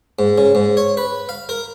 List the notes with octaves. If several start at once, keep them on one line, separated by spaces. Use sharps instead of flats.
G#2
C#3
G#2
C#5
B4
F5
A#4